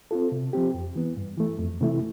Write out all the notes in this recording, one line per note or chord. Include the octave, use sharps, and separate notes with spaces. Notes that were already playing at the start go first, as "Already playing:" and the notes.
C4 F4 A4
C3
F3 C4 G4
F2
E3 B3
G2
E3 A3
F2
C3 E3 A3 E4